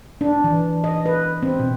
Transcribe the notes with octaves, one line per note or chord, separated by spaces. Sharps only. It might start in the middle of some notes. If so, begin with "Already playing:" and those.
D4
E3
D#5
B4
C4
B2